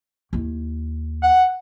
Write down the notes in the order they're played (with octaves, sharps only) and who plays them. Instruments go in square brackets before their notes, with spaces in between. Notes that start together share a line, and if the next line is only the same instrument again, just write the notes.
[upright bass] D#2 E4
[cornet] F#5